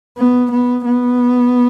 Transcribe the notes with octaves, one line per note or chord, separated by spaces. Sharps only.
B3
B3
B3